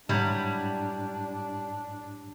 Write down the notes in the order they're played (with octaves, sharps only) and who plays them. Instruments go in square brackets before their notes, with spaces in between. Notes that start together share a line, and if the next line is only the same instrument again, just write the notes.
[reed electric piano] G#2 [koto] F#3 E4 [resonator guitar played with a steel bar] G3 [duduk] D4